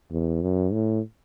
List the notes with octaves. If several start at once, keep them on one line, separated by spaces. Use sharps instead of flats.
E2
F#2
A2